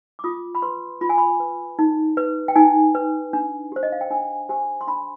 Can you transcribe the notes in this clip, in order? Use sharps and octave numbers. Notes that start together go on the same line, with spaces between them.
D6
F4 D#6
B5
B4 C6
F4 B5
G#5
B5
B4
D#4
B4
G5
D#4 G#5
B4
D4
G4 C5
D#5
F5
G5
D4 G#5
G4 C5 G#5
C6
D4 B5